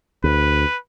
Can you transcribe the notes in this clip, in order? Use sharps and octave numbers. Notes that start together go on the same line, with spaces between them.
D2 B4